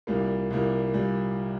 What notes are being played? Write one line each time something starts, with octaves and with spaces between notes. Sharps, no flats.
C2 A#2 G3 A#3
C2 A#2 G3 A#3
A#2 G3